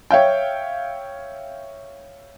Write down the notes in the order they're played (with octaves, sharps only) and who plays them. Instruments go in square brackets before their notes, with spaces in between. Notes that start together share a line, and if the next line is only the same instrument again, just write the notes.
[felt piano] C#5 E5 F5 G5